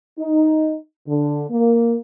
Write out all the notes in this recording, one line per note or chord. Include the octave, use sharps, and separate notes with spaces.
D#4
D3
A#3